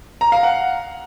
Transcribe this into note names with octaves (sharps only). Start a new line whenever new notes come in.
A#5
F5
F#5